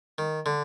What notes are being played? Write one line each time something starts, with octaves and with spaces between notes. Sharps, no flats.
D#3
D3